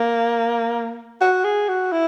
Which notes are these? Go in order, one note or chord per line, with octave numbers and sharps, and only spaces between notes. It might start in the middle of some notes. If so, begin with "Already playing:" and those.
Already playing: A#3
F#4
G#4
F#4
E4